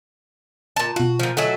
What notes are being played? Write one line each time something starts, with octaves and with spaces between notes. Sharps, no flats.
A#2 A5
B2 F4 F#4
A#2 F3
F#3 A3 F#4 A4 D#5 G#5